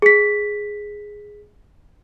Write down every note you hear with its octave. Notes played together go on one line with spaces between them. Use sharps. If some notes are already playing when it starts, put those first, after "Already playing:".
G#4 B6